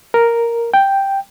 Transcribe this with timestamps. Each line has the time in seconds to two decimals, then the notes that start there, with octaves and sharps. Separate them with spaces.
0.14 A#4
0.74 G5